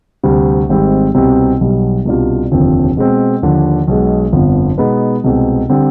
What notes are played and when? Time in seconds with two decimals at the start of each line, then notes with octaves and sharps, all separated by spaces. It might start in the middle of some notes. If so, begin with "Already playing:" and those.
0.23 D2 C3 G3
0.69 G#1 G#2 G3 C4
1.15 C2 B2 G3 C4
1.61 B1 B2 G3
2.05 C2 B2 G3 D4 F4
2.51 F1 D#2 D3 F3 C4
2.97 B2 G#3 C4
3.42 D#2 D3 F3
3.87 B1 B2 G#3
4.32 G1 F2 D3 F3 B3
4.78 B2 G#3 B3 D#4 B4
5.24 C2 B2 G#3 C4
5.69 D3 G3 C4